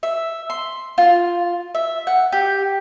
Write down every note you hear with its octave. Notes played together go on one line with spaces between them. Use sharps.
E5
C6
F4
E5
F#5
G4